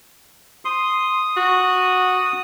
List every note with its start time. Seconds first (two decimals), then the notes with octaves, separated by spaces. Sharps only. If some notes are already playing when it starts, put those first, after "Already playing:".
0.65 C6 D#6
1.37 F#4